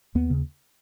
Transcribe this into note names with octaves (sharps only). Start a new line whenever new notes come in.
D#2 B3
C#3